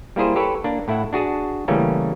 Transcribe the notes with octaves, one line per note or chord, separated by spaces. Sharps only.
G3 A#3 E4 G#4 C5
G4 A4 B4 C#5
A#3 D4
A2 E4 E5 F#5
D4 F#4 G#4 A5
C#3 E3 G3 A3 A#3 C#4